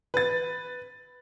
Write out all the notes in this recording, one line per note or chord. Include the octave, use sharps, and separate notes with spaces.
B4 A6